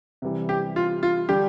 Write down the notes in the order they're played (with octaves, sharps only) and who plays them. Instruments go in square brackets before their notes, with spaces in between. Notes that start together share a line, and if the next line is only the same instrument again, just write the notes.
[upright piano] C3 E3 G3
[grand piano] G4
F4
F4
[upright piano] D3 G3 D4 [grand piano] G4